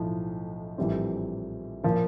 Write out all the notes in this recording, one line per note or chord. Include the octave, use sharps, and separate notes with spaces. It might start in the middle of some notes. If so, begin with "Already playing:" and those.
Already playing: B1 A2 F3
A#1 A2 E3 G3 C4
A#2 F3 A#3